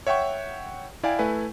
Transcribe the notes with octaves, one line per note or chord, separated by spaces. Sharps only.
C#5 E5 F#5 G5 C#6
E4 D5 F5 G5 G#5
A3 E4 B4 G#5